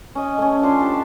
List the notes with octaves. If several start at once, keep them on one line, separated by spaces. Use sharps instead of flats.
C#4 D#5
A3 C#4
F3 D4 C6
G4 A5